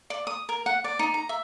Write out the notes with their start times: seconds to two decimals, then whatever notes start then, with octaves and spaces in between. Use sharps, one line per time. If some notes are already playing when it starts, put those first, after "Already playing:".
0.10 D5
0.27 D#6
0.49 A#4
0.66 F#5
0.84 D5
0.99 D#4
1.14 A#5
1.29 E5